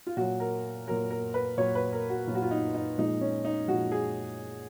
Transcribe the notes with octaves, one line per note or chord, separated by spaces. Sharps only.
F4
A#2 F#3 F#4
A#4
A#2 F#3 A#4
A#4
B4
A#2 F#3 C#5
B4
A#4
F#4
A#2 F#3 F4
F#4
F4
D#4
D#4
A#2 F3 G#3 D#4
C#4
D#4
A#2 F3 G#3 F#4
G#4